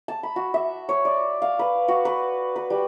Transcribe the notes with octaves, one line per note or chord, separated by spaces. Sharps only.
A5
B5
F#4
E5
C#5
D5
F5
B4
F#4
B4
B4
G3